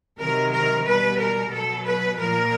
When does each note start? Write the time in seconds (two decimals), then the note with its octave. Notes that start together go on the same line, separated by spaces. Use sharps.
0.18 C3 D#3 F#3 A#4
0.51 A#4
0.85 B2 G3 B4
1.18 A#4
1.51 B2 F#3 A4
1.84 B4
2.17 A#2 F3 A#4